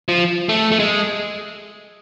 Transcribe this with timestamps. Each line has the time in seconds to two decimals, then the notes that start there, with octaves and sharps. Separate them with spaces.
0.09 F3
0.49 A3
0.72 A3
0.79 G#3